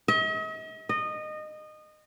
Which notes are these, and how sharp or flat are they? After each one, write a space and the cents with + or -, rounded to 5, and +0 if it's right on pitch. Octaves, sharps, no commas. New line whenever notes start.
D#5 +45
D#5 -20